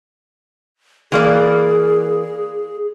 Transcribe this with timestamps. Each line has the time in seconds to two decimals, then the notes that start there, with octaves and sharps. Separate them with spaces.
1.12 E3 A#3 G#4 D5